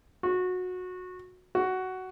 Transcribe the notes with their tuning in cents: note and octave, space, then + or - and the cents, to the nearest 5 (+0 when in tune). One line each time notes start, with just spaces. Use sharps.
F#4 -20
F#4 +10